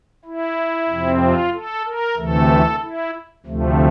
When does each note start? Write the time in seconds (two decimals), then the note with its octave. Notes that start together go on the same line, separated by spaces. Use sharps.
0.25 E4
0.89 F2 C3 F3 C4
1.21 F4
1.53 A4
1.86 A#4
2.17 D2 C3 E3 A3 A4
2.82 E4
3.46 D2 C3 F3 A3